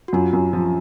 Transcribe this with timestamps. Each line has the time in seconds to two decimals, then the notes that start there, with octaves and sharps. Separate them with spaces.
0.08 F#4
0.13 F#2 F4
0.33 F#2
0.53 F3